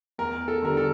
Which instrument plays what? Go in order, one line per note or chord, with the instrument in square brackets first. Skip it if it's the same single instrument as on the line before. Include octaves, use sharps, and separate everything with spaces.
[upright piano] E2 A#4
A4
D3 G3 A#4
A4